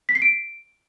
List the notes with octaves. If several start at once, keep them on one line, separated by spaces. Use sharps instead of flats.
B6
C7
D7